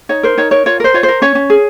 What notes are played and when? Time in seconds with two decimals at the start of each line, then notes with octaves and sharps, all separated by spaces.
0.09 D#4 C#5
0.23 A#4 C5
0.37 D#4 C#5
0.51 A#4 C#5
0.66 F4 C#5
0.80 A#4 C5
0.94 F4 C#5
1.03 A#4 C5
1.22 C#4 C#5
1.35 C#4
1.50 G#4